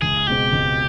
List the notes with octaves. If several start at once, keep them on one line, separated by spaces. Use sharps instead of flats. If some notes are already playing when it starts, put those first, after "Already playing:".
C#2 G#4
B2 G#3 C4 G4
C#2